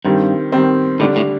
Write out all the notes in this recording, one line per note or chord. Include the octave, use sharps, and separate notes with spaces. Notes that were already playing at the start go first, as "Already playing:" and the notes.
G2 D#3 G3 C4
D#3 G3 C4
A2 D3 G3 D4 G4
A2